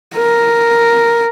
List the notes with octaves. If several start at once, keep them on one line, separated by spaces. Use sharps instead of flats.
A#4